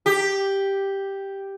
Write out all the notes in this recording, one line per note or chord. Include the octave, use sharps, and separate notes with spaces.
G4